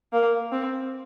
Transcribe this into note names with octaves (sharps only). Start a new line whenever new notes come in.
A#3
C4